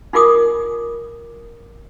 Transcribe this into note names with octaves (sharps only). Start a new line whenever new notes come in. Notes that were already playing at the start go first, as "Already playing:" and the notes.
D#4 F4 A#4 D6 D#6